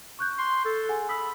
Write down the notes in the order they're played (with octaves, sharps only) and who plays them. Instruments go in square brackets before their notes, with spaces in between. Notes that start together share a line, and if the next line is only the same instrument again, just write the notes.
[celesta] C#6 F#6 G6
[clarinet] C6
A4
[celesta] G#4 F#5 G#5
[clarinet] B5 [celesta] D#6 E6